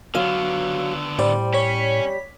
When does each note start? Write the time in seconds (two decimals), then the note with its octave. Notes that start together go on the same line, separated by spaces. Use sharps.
0.15 D3 F#3 B3 F5
1.19 A2 G3 C5 D5
1.53 C#4 C#5 B6